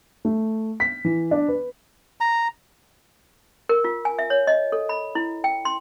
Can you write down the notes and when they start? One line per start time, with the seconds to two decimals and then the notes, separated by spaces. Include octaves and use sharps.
0.25 A3
0.80 B6
1.05 E3
1.31 D4
1.48 B4
2.21 A#5
3.69 A#4
3.84 F4
4.05 G#5
4.19 E5
4.30 C#5
4.47 D#5
4.72 A4
4.89 B5
5.15 E4
5.44 G5
5.65 C6